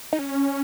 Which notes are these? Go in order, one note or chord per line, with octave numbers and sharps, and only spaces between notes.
D#4
C#4